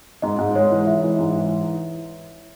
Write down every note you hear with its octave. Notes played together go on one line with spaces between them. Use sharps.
G#2 D#5
G#2
G#3 C#5
E3
G#3 E5
E3
G#2
E3